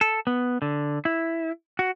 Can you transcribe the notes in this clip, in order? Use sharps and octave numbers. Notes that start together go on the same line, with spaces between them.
A4
B3
D3
E4
F#4